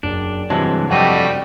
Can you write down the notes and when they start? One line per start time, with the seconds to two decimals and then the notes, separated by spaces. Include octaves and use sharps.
0.03 F#1 D4
0.50 G2 C3 E3 F#3 G#3 A5
0.90 F2 G3 A3 F#4 D#5